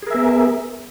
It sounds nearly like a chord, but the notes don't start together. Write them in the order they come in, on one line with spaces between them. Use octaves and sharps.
G#4 A#4 E5 B3